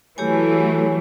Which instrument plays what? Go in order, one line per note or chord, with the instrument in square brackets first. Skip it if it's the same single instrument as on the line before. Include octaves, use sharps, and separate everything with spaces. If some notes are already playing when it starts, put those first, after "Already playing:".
[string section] E3 F#3 A3 [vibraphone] G4 C#5 G#5